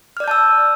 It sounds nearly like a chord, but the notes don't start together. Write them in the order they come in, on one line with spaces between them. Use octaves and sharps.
F6 D5 G6 A5 E6